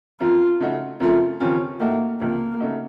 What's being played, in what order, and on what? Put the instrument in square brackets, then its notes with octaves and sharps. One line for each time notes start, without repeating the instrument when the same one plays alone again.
[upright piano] F#2 F3 C4 [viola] F4
[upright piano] C#3 A3 D#4 F#4
[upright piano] F#2 C#3 F3 A3 C4 [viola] F4
[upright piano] D#2 C#3 F3 C4 F4 [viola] C#4
[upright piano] A2 A3 D#4 F#4 [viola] A#3
[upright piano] C#2 C3 F3 [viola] A#3
[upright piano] C#3 A3 D#4 F#4